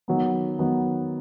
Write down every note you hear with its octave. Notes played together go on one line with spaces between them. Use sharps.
D#3 F#3 B3
D#3 F#3 B3